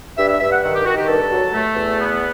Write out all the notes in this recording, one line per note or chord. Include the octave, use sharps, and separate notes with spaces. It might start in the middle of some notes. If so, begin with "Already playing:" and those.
G2 E5
E5
G2 E5
F#5
D#3 F#5
G4
D#3 F#4
G4
G2 A4
F#3
A3
E2
B3